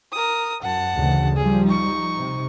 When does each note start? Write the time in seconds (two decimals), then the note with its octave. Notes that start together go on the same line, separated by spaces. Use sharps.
0.12 A#4 D#6
0.62 F#2 F#5 A5
0.95 D2 C#3 E3
1.36 F3 G3 G#4
1.65 D#4 C#6
2.17 C3